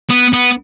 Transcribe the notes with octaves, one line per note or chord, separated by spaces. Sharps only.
B3
B3